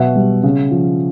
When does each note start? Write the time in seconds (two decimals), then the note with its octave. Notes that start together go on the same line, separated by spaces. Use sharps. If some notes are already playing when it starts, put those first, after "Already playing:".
Already playing: B2 F#3 E5 F#5
0.16 G3
0.43 C#3
0.71 F3